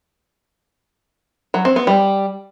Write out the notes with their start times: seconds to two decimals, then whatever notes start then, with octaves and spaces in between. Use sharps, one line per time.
1.54 F#3
1.65 C4
1.76 B3
1.87 G3